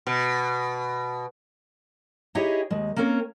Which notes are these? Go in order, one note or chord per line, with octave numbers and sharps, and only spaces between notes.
B2
D#4 E4 G4 G#4 C#5 D#5
D#2 G#3
A#3 C4 C#4 A#4 C#5